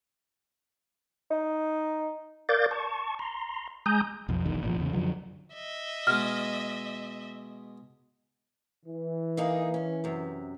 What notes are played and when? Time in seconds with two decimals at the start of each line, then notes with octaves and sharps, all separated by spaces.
1.31 D#4
2.49 A#4 D5 F5 D6 G6 A6
2.71 A5 C#6
3.19 A#5 C6
3.86 G#3 G#5 A#5 D#6 G6
4.29 B1 F2
4.45 E1 B1 E2 D#3
4.62 G#1 A#2 D3 F3
4.78 E2 C#3
4.93 F#2 D3 F3 F#3
5.54 D#5 E5
6.07 B2 G#3 F6
8.86 E3
9.37 A#3 D#4 G#4
9.74 C#4
10.04 F#2 C3